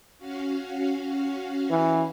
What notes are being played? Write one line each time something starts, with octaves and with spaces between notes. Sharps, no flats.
C#4 F#4 F5
E3